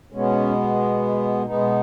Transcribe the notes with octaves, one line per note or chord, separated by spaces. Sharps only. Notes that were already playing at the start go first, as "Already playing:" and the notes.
B2 G#3 B3 C#4
B2 G#3 B3 D#4